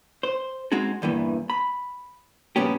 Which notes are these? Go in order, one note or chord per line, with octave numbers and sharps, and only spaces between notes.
C5
G#3 C4 D#4 F#4 G#4
E2 G2 A#2 E3
B5
G2 A#2 F3 B3 C#4 G4